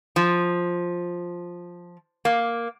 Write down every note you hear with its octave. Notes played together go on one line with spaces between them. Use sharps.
F3
A#3